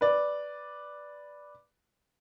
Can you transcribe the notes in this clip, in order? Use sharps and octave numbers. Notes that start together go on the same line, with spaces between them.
B4 D5